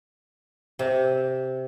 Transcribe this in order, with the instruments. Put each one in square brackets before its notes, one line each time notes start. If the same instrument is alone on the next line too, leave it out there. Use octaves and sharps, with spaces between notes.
[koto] C3